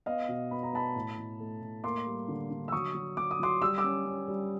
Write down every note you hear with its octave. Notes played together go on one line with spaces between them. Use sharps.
B3 D#5 F5
B2
B3 B5
A#5
B3 A5 B5
A2
A2
A3
A2
A#3 C6 D6
G3
D3
D3
E6
F#3 C#6 D#6
F#3
F#3 D6
D#6
F#3 C6 D6
G3 E6
D6 E6
C#4
C#4
G3